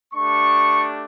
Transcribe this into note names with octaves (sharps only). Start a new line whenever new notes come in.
A3 D4 G4 C#6